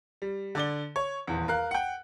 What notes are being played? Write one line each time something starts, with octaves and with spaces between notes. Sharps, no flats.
G3
D3 D5 G7
C#5
D#1 E2
A#4 F5 F#6
F#5 G5